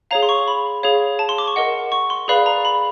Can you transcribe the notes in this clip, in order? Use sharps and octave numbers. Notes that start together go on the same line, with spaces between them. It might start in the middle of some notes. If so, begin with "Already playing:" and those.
G#4 C#5 F5 A#5
C6
C#6
B5
G#4 C#5 F5
A5
C6
D6
C#6
A#4 D#5 F#5
C#6
C6
G#4 B4 D5 F5 B5
A#5
B5